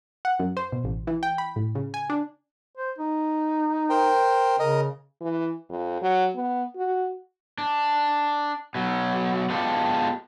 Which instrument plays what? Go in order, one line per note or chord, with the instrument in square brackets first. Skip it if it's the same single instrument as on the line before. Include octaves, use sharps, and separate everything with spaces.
[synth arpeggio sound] F#5
F#2
C5
B2
A1
E3
G5
B5
A2
C#3
G#5
D4
[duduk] C5
D#4
[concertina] A#4 C5 G5
[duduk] C#3 [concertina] A#4 D#5
[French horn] E3
F2
F#3
B3
F#4
[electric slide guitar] D4
B2 F#3
G#3 B3 D4 F4 G4 A4